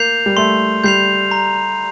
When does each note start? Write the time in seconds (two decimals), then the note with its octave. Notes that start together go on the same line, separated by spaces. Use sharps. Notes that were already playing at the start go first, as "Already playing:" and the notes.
Already playing: A#3 G6 C7 F7
0.26 G3
0.37 A3 C6
0.84 G3 G6 C7 F7
1.31 A#5